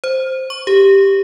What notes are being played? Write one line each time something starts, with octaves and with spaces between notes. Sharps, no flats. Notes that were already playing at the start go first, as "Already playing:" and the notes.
C5
C#6
G4